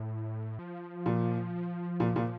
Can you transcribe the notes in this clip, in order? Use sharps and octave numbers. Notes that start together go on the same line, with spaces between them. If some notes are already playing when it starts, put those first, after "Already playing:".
Already playing: A2
F3
A#2
A#2
A#2